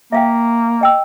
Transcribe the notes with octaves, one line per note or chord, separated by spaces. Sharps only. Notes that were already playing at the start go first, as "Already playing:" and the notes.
A#3 E5 F5 G5
D#5 G5 E6